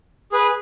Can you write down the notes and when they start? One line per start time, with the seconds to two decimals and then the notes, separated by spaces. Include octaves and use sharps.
0.32 G#4 B4